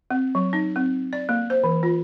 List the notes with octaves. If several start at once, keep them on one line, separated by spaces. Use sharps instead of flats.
C4
F#3
D#4
C4
D5
A#3
C5
E3
F4